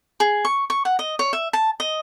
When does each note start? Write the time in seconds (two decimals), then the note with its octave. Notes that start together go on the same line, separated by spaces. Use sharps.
0.20 G#4
0.45 C#6
0.70 C#6
0.85 F#5
0.99 D#5
1.19 C#5
1.33 E5
1.53 A5
1.80 D#5